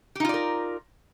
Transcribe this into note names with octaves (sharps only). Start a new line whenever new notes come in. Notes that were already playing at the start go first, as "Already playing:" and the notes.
D#4 F4 G4 A#4 D5